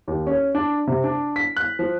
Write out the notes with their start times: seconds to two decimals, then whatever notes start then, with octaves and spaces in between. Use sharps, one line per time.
0.08 D#2
0.27 C#4
0.55 D4
0.87 C3
1.04 D4
1.36 B6
1.57 F#6
1.79 F3